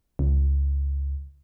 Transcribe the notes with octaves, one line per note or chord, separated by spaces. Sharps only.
C#2